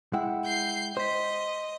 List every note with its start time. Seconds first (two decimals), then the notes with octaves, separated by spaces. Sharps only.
0.13 G#3 E4 F#5 G5
0.46 G6 C7
0.97 C5 D#5 C6 B6